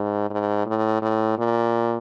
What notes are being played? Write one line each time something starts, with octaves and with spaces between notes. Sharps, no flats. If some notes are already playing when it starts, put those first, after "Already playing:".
Already playing: G#2
G#2
A2
A2
A#2